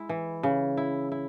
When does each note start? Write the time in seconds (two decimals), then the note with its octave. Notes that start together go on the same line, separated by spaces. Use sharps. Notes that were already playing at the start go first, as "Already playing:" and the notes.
Already playing: G#3 E4
0.09 E3
0.43 C#3
0.77 E4
1.12 E4